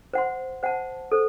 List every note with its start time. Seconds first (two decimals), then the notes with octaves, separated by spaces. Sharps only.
0.13 C5 F#5 C6
0.63 C5 F#5 A5
1.12 A4 C5